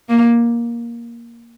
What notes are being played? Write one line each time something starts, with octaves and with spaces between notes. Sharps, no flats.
A#3